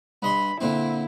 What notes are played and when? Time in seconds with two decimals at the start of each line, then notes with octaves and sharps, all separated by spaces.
0.22 G2 D#5 B5 C6
0.61 A#2 D3 C4 E4